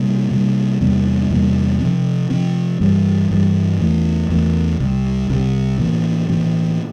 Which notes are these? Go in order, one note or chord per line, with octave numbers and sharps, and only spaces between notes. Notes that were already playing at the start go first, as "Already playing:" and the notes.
Already playing: C3 G3 A#3
C3 G3 A#3
E2 C3 G3 A#3
E2 C3 G3 A#3
C3 F3 C4
C3 F3 C4
G2 E3 G3
G2 E3 G3
E2 E3 A3
E2 E3 A3
C2 C3 G3
C2 C3 G3
A2 E3 A#3
A2 E3 A#3